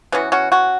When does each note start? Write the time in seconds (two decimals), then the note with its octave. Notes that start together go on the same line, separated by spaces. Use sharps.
0.12 E3 B3 C#4 F#4
0.32 C#4 F#4
0.52 C#4 F#4